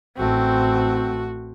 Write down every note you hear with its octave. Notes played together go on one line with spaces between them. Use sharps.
A1 A3 C4 F#4